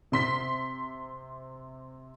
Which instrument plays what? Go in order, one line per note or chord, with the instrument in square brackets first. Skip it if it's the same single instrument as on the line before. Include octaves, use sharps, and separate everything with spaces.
[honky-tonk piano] C3 C6 B6